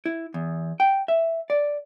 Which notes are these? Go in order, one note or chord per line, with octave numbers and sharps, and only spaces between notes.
E4
E2
G5
E5
D5